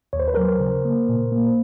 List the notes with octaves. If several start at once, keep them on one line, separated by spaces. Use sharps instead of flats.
D#2 C#5
C5
B4
F#3 A#4 C5
C#3
A#3
A#2
A#3